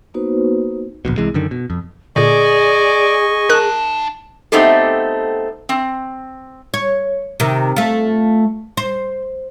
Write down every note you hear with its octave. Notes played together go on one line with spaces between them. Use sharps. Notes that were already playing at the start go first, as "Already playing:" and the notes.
A#3 B3 D#4 F#4 B4 C5
D1 A#1 B2
C2 C3 E3 G#3
F#2 D3 D#3
B2
F2
A#2 D3 G#4 D5 D#5 G#5 C#6
D#4 A#4 A5 F#6
A3 B3 C4 D#4 G4 A4
C4
C#5
C3 D#3
A3 F4
C5